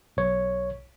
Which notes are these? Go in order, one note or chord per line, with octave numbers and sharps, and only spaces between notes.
B1 C#5